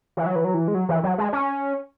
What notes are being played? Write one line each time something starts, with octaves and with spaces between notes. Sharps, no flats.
E3
F#3
E3
F#3
E3
G#3
F#3
E3
F#3
G#3
C#4